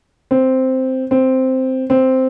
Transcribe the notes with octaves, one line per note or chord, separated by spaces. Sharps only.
C4
C4
C4